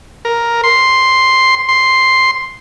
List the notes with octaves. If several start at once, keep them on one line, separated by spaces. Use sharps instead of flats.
A#4
C6
C6